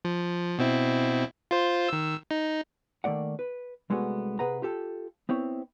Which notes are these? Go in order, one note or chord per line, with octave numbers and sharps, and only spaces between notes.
F3
B2 C4 E4
F4 C5
D#3 E6
D#4
D#3 A3 A#3 D5 F#5
B4
C2 G#3 A3 B3 F#4
C3 G#4 B4 F#5 A#5
F4 G4 A4
B3 C4 E4 C#5